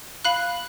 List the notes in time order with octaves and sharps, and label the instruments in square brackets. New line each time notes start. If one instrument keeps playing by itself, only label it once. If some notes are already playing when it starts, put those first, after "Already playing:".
[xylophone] F5 B5 F#6